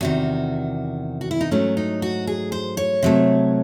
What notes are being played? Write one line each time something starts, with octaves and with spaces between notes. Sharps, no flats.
E2 C3 D#3 F#4
F#4
E4
D#4
G#2 F#3 A3 C#4
D#4
F#4
G#4
C5
C#5
C3 F#3 A3